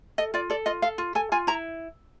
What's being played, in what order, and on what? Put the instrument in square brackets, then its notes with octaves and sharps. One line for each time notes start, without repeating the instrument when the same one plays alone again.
[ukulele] A4 D#5
F4 D5
A4 D5
F4 D#5
A4 F5
F4
A4 G#5
F4 G#5
E4 A#5